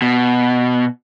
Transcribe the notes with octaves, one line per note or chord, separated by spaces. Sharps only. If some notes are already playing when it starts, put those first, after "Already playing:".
B2